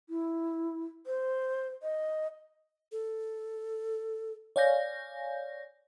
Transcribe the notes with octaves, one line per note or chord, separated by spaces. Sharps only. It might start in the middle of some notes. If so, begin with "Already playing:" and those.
E4
C5
D#5
A4
C#5 D5 F5 G#5 G6 A#6